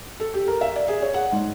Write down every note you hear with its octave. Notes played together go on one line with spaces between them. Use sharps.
A4
G4
A#4
E5
D5
G#4
C#5
F#5
G#2